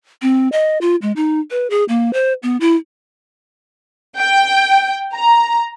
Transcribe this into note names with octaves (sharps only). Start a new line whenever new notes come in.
C4
D#5
F4
G#3
D#4
B4
G#4
A#3
C5
B3
E4
G5
A#5